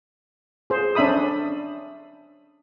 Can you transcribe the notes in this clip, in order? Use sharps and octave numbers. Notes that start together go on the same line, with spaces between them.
G#4 C5
C#4 D4 E5 B5 D#6